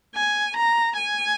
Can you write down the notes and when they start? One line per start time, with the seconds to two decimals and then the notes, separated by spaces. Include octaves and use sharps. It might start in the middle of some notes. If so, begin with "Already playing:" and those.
0.15 G#5
0.56 A#5
0.97 G#5